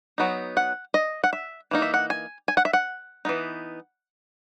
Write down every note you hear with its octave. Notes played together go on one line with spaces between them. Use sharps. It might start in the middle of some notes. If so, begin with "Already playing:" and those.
F#3 B3 D#4
F#5
D#5
F#5
E5
E3 A#3 D#4
E5
F#5
G#5
G#5
F#5
E5
F#5
E3 B3 D#4